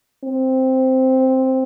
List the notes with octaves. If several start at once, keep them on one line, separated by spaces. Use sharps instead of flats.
C4